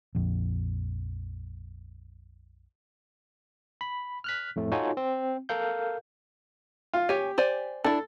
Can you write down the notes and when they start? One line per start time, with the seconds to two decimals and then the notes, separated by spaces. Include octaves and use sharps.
0.15 A#1 F2
3.81 B5
4.24 F6 F#6 B6
4.56 F2 A2 A3
4.72 D#4 F4 F#4 A4 C#5 G#5
4.97 C4
5.49 A4 A#4 F5 G6
6.93 F4
7.09 G4 C#5 G#5
7.38 C5 D5 G#5
7.84 D4 E4 A4